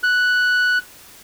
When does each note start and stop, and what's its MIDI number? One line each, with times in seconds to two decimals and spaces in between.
0.03 0.78 90